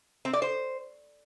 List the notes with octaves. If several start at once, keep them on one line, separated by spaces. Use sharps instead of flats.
C4
D5
C5